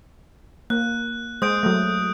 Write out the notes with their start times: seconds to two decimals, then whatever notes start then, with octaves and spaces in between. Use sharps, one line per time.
0.70 A#3 F#6
1.42 G#3 C5 D#6 G6 D7
1.63 F#3 A3